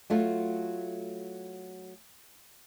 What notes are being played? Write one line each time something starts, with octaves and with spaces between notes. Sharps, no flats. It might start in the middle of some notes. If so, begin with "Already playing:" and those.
F#3 A3 F4